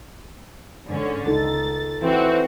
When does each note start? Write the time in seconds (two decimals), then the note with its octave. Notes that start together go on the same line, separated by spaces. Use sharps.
0.88 G#2 D3 C#4
1.27 C#2 D#4 A4 A6
2.02 E3 C4 F#4